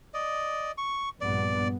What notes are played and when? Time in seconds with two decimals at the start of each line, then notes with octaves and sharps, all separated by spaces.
0.14 D5 D#5
0.78 C#6
1.21 A#1 G2 B3 D5